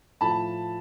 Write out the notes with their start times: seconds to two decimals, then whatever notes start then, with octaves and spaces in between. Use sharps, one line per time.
0.21 A2 F3 A5 B5